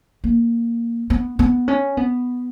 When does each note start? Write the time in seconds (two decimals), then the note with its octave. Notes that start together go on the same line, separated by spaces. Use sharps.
0.24 A#3
1.10 B3
1.39 B3
1.68 C#4
1.97 B3